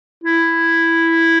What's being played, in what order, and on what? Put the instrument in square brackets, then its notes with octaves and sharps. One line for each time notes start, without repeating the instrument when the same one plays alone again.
[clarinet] E4